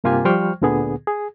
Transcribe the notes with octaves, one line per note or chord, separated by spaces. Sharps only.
G2 C3 A#3 F4 G4 G#5
F3 G3 C5 G5 C#6 F6
D2 A#2 D3 B3 G#4
G#4